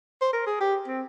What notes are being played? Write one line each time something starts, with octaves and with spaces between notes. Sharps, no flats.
C5
A#4
G#4
G4
C4